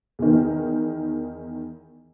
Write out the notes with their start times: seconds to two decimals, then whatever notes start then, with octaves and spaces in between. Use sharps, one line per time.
0.19 E2 D#3